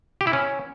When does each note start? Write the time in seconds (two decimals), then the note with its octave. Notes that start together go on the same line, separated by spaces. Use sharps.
0.21 G4
0.27 E4
0.33 C#4